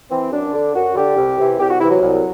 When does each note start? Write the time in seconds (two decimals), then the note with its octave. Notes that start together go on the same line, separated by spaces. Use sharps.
0.10 E3 C4
0.32 F#2 D4
0.53 D3
0.75 F#2 F#4
0.96 D3 G4
1.17 C2
1.38 C3 E3
1.59 C2 G4
1.70 F#4
1.80 C3 E3 E4
1.90 F#3
2.01 C2